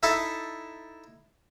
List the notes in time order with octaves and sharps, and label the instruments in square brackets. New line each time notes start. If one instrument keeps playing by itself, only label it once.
[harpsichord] D#4 E4 A4 E5 A5